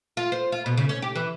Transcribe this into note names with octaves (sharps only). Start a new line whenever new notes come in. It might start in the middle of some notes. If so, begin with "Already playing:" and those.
F4
C5
F4
B2
C#3
C#4
G4
E3